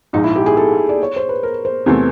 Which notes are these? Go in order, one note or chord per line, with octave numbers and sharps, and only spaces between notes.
A#1 G#2 F3 D#4
E4
G4
G#4
A4
D5
C#5
C5
B4
A#4
C5
E2 C3 E3 A3 C4